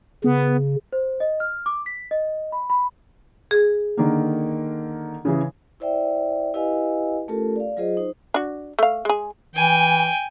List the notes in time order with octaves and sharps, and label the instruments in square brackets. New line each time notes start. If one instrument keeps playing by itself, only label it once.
[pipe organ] C#3 [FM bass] B3
[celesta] C5
D#5
F6
D6
B6
D#5
B5
B5
[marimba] G#4
[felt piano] D3 D#3 A#3
C#3 E3 G#4
[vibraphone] E4 C5 D5 E5 G5
E4 G4 B4 D#5 F5 G#5
A3 C#4 F4 G4 A4 A#4
D5 F5
F#3 F4 G#4 C5 D#5
D#4 C5
[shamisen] D4 F#4
A3 F5
G#3 G#4
[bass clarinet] E3 [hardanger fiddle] G5 G#5